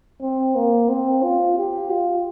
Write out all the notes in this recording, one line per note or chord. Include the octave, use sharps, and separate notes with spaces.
C4
A#3
C4
F4
G4
F4